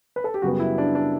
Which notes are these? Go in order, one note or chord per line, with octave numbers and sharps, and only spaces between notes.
B4
A4
G4
F#2 C#3 G3 B3 F#4
E4
D4
D4